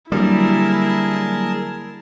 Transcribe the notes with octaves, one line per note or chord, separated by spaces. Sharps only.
D3 F#3 G3 A#3 E4 G#4 A#4 A5